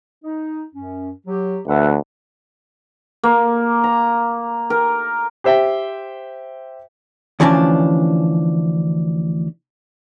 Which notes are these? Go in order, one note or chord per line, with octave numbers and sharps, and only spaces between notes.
D#4
F#2 C#4
F#3 G4
D2 B4 E5 F#5
A#3
A#5
A#4
G4 C5 E5 G5
D2 E3 F3 C#4 D4